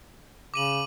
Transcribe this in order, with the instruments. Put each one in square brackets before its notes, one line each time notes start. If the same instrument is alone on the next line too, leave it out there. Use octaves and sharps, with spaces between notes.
[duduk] C#3 [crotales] D6 D#7 F#7